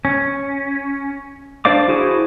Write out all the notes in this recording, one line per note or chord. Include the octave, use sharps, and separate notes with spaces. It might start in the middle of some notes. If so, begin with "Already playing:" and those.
C#4
D4 C5 D5 F5 D6
E4 F#4 G#4 C5